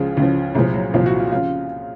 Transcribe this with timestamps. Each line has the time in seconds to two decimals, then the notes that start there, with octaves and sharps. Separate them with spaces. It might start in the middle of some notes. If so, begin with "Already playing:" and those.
Already playing: C#2 C#3 F3 G#3
0.17 C#2 C#3 F3
0.55 C2 A#2 F3 G#3
0.74 F#3
0.94 C2 A#2 F3
1.06 F#4
1.19 F4
1.32 C#3 F3 F4